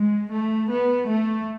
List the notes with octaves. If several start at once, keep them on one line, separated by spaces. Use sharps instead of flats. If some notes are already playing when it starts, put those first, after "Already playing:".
Already playing: G#3
A3
B3
A3